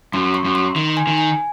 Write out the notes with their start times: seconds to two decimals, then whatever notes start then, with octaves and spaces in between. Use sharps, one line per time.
0.13 F#2 C6
0.34 C#6
0.45 F#2
0.55 C6
0.76 D#3 C6
0.97 G#5
1.07 D#3
1.18 G#5